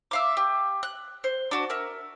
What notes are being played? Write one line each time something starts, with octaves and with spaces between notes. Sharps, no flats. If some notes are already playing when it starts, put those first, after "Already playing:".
E5 F5 D6
G4
F#6
C5
D4 F#4
A#4 E5